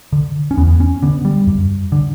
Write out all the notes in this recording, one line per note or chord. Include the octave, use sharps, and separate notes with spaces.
D3
C#4
E2 B3
C#4
D3 B3
G3
F#2
D3